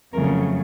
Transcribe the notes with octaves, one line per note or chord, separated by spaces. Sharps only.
F2 C#3 F#3 A3 A#4